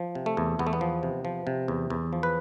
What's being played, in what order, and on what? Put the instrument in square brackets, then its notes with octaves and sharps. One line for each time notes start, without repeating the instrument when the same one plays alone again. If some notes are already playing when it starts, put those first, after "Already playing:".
Already playing: [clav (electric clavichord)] F3
C3
A3
E2
E2 B3
A3
B3
F3
C3
F3
C3
E2
E2
F3
B4